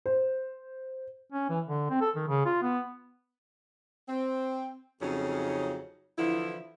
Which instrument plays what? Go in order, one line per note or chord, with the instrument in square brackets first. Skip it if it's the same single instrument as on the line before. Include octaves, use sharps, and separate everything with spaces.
[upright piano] C5
[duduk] C#4
E3
D3
C4
A4
D#3
C#3
F4
B3
[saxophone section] C4
F2 C#3 F#3 C#4 D#4
D3 E3 F3 E4